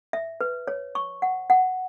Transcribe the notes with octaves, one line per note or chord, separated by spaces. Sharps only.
E5
B4
C#5
C#6
F#5
F#5